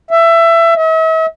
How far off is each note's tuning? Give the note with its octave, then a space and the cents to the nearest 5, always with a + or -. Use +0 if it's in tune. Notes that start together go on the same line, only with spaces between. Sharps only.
E5 +20
E5 -45